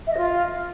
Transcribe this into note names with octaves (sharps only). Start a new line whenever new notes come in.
E5
D#5
F4